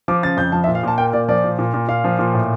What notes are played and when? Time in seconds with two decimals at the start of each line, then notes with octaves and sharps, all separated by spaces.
0.08 F3 D6
0.23 C#3 A6
0.37 F2 G6
0.52 F3 A5
0.64 E5
0.67 A#2
0.75 F5
0.83 A#2 A5
0.98 A#3 G5
1.13 A#2 D5
1.28 F3 D5
1.44 A#2
1.59 A#2
1.74 A#2
1.88 A#2 F5
2.04 F3
2.19 A#2
2.34 A2